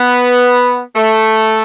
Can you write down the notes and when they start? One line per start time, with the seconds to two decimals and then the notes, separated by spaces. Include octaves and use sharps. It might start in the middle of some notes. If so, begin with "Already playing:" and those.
Already playing: B3
0.96 A3